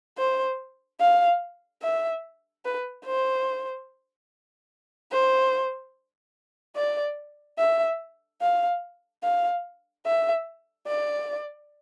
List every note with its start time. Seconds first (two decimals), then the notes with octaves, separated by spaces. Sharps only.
0.18 C5
1.00 F5
1.83 E5
2.65 B4
3.06 C5
5.12 C5
6.76 D5
7.59 E5
8.41 F5
9.23 F5
10.06 E5
10.87 D5